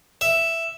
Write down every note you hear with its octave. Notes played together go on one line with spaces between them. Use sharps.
E5